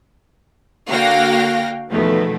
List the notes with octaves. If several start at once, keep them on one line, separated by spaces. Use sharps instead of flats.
D3 A#3 F#4 F5 G5 A#6
E2 B2 D#3 F3 A3